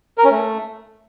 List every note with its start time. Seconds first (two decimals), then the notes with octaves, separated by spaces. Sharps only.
0.18 A#4
0.24 C#4
0.31 A3